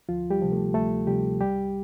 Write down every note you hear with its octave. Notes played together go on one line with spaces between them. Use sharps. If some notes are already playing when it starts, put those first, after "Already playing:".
D2 F3 F4
G3 G4
C3 F3
A3 A4
D2 A3 A4
C3 F3 G3 G4
C2 G3 G4